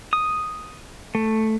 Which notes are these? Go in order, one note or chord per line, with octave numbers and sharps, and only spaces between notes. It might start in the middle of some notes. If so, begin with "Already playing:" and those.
D#6
A3